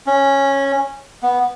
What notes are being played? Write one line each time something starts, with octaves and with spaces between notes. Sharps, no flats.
C#4
B3